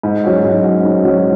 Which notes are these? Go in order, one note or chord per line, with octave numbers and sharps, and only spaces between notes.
G#2
F#3 C#4 F#4
G#2
F#3 C#4 F#4
G#2
F#3 C#4 F#4